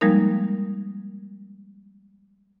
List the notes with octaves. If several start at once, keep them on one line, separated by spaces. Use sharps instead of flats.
F3 G3 G#3 A#3 D#4 A#4